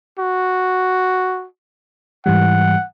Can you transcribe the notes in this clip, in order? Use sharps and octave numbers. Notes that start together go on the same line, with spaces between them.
F#4
G#2 E3 G3 F#5